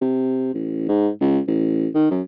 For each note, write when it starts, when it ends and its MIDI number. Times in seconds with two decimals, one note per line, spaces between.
0.01 0.53 48
0.54 0.84 33
0.88 1.09 44
1.21 1.40 37
1.48 1.88 33
1.95 2.10 51
2.11 2.21 42